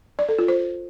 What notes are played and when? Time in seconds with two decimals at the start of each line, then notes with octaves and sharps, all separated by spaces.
0.19 D5
0.29 A4
0.38 F4
0.48 C5